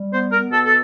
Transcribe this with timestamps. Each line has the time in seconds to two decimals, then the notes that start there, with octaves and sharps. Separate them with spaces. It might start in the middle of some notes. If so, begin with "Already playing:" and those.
Already playing: G3
0.11 B3 C5
0.32 B3 A#4
0.52 B2 A4
0.65 A4